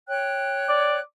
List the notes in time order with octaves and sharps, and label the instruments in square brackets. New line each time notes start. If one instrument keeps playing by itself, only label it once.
[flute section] C#5 G5 F#6
[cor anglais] D5